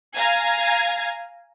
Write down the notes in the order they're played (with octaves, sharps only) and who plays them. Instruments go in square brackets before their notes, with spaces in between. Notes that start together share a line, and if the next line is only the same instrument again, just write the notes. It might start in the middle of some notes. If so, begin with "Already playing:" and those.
[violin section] F5 G#5 A#5 G#6